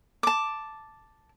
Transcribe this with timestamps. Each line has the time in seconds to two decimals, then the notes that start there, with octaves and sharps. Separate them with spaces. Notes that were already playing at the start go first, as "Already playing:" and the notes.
0.23 A5 D6